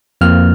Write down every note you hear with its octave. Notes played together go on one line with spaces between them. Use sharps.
F2 F3 A#3 F6